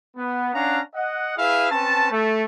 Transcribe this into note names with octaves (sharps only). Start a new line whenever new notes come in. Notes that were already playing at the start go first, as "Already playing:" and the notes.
B3
C#4 D4 F5 F#5 A#5
D#5 F#5
E4 G#4 B4 E5 F5
C4 C#4 B4 A5
A3